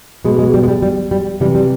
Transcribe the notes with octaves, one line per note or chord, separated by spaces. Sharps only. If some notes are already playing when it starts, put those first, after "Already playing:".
B2 G#3
G#3
G3
G#3
G3
G3
G3
C3 E3 G3
G3